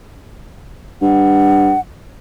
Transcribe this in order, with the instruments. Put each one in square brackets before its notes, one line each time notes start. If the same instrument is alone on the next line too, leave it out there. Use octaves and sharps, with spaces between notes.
[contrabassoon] G2 [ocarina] F#5